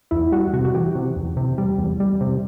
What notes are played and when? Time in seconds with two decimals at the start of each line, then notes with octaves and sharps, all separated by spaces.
0.11 E2 E4
0.32 G3 F#4
0.54 C3 F#4
0.65 F#4
0.75 E3 G4
0.95 C3
1.16 E2
1.37 C3
1.58 G3
1.78 E2
2.00 G3
2.21 C3